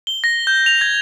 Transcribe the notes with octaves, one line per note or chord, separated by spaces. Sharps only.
G7
A#6
G6
F7
G#6